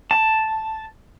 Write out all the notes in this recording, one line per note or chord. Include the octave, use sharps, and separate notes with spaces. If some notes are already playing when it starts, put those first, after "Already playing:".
A5